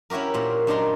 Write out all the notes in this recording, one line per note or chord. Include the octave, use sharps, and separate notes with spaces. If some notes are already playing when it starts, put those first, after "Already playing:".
C#4 E4 F#4 G4 A#4
A#2 C5
F#2 D4 D#4 D5 A#5 C6